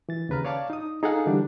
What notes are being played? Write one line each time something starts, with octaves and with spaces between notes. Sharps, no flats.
E3 A6
D#2 C#3 B4 A#5 F6
C#5 D5 F5 A5 D6
D#4 D#6
D#4 G#4 A4 F5 F#5 G#5
D3 E3 G3 D4